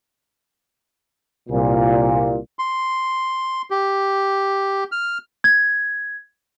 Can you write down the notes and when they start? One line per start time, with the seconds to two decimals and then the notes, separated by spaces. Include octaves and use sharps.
1.49 C2 A#2
2.59 C6
3.71 G4
4.92 F6
5.44 G#6